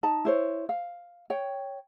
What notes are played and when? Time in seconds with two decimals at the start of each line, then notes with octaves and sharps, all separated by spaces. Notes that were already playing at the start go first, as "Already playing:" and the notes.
0.03 D#4 A5
0.25 E4 C5 C#5
0.69 F5
1.30 C#5 G5